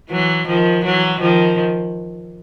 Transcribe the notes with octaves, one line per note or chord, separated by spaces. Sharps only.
E3 F#3
D#3 F3
E3 F#3
D#3 F3